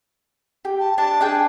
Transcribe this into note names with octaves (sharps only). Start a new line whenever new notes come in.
G4
A5
D4 A5
D4 G#4 G5